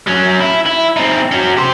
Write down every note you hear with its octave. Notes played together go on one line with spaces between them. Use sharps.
F#3 C#4
E4
E4
C4 D#4
C#4 F#4
G4 C5